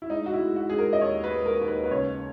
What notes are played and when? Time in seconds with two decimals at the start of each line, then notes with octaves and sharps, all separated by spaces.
0.02 E4
0.10 G#3 D#4
0.26 F#4
0.33 E4
0.41 G#3
0.56 F#4
0.70 G#3 G#4
0.78 A#4
0.93 D#5
1.01 D#2 C#5
1.24 B4
1.31 G#3
1.46 A#4
1.61 D#2
1.68 B4
1.84 B4
1.91 C#2 C#5